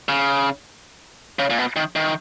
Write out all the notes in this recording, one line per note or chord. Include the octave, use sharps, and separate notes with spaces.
C#3
C#3
A#2
B2
D#3
D#3